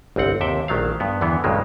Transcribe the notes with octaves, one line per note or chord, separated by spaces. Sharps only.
G1 C2 C4 F#5
D#2 C3 E5 G5
A#1 D#3 F#3 A3 F5
G2 B3
E2 D3 E3 B3
B1 G2 C#3 F#3 G#3 A#3